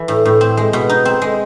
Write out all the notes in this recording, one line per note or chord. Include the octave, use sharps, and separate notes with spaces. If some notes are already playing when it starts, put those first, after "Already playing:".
Already playing: E3
A2
A2
C4
G#3
B2
D#4
C4
G#3